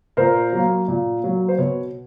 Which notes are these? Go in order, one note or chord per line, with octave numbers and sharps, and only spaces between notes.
A#2 A#4 C5
F#3 A#3
A#2
F#3 A#3
C5
B2 B4 C#5